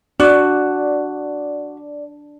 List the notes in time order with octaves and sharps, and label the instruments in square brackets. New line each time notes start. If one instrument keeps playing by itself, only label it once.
[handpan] D4 [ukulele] F#4 [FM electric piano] D5